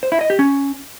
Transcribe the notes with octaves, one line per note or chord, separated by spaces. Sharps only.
C5
E4
D#5
G4
C#4